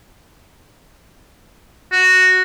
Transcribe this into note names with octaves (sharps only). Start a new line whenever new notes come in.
F#4